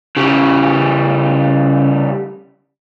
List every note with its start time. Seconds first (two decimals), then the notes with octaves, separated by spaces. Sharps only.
0.17 C#3 G3